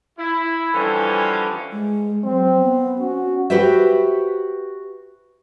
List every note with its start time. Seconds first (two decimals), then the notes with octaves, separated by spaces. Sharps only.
0.19 E4
0.73 D3 E3 F3 G3 C#4 A4
1.72 G#3
2.24 F#3 C4
2.59 B3
2.98 C#4 F#4
3.50 F#4 G4 B4 C5 E5